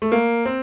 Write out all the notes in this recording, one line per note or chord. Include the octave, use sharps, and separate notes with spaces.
A3
A#3
C4